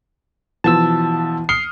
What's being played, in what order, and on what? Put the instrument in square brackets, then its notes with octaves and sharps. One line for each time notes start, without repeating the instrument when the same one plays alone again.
[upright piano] B2 F3 [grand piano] E3 [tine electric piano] A5 E6
[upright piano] D#6 F6 C#7 [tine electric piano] C7 [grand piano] G7